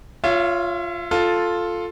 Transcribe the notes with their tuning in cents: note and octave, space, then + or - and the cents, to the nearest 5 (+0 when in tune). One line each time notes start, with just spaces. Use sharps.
F4 +0 C#5 +10 E5 +35
F4 +5 A4 +0